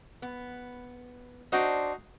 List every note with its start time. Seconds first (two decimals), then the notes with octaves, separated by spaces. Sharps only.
0.22 B3
1.52 D4 D#4 F#4 C5